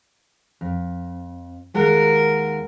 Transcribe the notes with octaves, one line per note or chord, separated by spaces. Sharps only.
F2
D#2 G#3 A#4 F#5